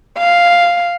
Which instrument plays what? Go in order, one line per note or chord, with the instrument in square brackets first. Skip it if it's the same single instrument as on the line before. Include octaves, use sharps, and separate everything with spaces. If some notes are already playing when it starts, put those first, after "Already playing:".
[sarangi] F5